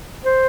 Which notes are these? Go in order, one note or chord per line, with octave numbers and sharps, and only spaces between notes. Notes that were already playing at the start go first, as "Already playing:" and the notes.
C5